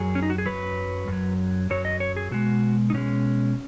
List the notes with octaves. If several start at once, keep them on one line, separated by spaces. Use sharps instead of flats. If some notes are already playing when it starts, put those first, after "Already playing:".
Already playing: F#2 F#3 G#4
C#4
D#4
F#4
G#4
F#2 F#3 B4
F#2 F#3
F#2 F#3 C#5
D#5
C#5
G#4
B2 G#3 F#4
D#4
B2 G#3 C#4